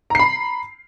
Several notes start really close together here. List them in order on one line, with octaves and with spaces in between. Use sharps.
A#5 C7 B5